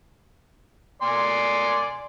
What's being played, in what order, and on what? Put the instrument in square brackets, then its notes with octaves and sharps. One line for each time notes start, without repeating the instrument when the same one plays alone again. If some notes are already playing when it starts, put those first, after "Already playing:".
[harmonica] D5 G#5 C6